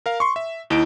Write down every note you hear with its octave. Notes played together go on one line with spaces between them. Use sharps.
A#4 F5
C6 C#6
E5
D#2 D#4 E4 D7